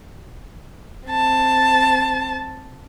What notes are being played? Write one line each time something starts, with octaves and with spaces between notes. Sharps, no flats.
C4 A5